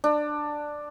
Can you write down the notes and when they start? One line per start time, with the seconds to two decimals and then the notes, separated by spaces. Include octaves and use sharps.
0.04 D4